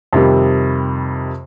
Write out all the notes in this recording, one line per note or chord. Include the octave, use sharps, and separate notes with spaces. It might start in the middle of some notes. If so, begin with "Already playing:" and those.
F2 C3 D#3 G3